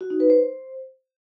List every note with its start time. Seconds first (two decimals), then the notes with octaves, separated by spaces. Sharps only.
0.01 F#4
0.10 D#4
0.20 B4
0.30 C5